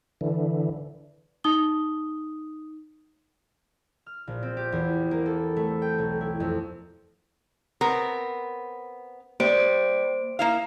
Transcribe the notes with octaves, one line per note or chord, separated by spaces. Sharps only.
D3 E3
D#4 D#6 G7
F6
A#1
C4
G4
E2
A#3
A4
A3
G5
B1
E4
F2
B3 C4 A#4
G3 A#3 C5 D7
A#3 E4 F5